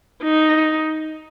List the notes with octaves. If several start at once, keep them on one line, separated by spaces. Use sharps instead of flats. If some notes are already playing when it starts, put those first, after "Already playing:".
D#4